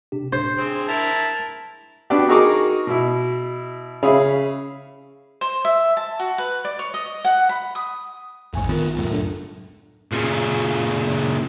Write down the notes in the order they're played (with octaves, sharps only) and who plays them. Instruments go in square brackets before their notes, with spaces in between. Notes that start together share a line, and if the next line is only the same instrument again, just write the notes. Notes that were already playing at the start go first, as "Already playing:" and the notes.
[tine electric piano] C3 D4 G4
[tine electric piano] D4 [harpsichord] C5
[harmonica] G#3 C4
[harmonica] E4 A#4 [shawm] A5
[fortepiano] B3 D4 F#4 G4
D#4 F#4 G#4 A#4 C#6 D6
B2 E4
C#3 G#4 C#5 E5 F5 B5
[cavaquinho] C5
E5
A5
F#4
B4
D5
C#5
D#5
F#5
B5
D#6
[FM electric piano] A1 G#5 C#6 [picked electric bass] E2 G#2
[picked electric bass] D#3 B3 [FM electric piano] F4 A#4
[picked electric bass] C#2 F#2 A2
[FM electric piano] D4 A4
[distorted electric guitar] A#2 C#3